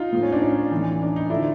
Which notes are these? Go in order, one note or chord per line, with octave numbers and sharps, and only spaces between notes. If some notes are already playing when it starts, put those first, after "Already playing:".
Already playing: D#4 F4
A2 F3
C#4
D4
C#4 D#4
A2 E3
D4
D#4
D3 F3 D4 E4